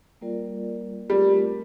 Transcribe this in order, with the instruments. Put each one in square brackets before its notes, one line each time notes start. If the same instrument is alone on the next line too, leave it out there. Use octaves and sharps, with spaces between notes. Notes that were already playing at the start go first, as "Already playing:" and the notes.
[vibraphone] G3 A#3 F4 A#4 D5
[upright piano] G3 [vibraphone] A3 C4 F4 A#4